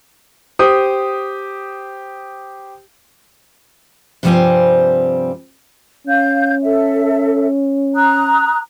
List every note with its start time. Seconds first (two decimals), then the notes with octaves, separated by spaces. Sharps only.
0.59 G4 C5 D#6
4.23 G2 C3 F3 G3 C4 G#5
6.08 C#4 F5 G6
6.63 A4 E5
7.95 A#5 D#6 F#6